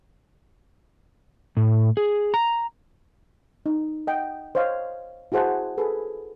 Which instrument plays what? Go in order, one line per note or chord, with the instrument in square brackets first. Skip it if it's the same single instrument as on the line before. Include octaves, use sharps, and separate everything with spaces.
[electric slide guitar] A2
G#4
A#5
[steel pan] D#4
D#5 F#5 G5
C5 C#5 D#5 F5
E4 F#4 G#4 C5 F#5 A5
G#4 A4 B4